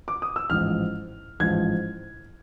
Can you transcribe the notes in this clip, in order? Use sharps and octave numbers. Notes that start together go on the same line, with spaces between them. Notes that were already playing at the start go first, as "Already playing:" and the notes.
D6
D#6
E6
A1 G#2 F3 F6
A1 G#2 F3 G#6